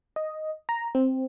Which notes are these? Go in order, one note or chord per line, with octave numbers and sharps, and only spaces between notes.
D#5
A#5
C4